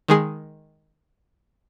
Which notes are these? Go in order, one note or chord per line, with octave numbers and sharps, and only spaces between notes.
D#3 G#3 G#4